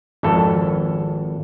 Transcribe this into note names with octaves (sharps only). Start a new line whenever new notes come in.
G#1 F2 E4 A4